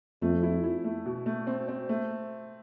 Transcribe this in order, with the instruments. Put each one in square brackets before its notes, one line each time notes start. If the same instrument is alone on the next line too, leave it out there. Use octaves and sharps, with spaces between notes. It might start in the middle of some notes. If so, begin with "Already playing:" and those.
[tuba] F2 [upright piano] A3
[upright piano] E4
E4
A3
B2
A3
C4
C4
A3